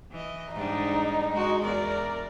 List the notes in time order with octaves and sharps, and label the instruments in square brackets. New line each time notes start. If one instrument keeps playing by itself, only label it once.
[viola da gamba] E3 D#5
[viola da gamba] G#2 G3 D4 [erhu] D#4
[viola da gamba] G#3 F#4
[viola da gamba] E2 D5 [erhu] A#4